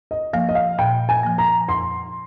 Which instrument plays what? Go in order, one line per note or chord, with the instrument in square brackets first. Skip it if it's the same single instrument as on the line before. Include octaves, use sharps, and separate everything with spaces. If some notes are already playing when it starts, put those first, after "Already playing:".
[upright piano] D#5
[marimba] F3 A#3 [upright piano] F5
[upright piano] D#5
F5
[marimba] A#2 [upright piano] G5
[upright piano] G#5
[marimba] F3 A#3
[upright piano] A#5
[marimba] F2 [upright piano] C6